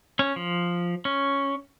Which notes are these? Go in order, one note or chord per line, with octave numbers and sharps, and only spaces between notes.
C#4
F3
C#4